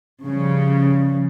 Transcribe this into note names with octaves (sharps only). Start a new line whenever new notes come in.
C#3 F3 G3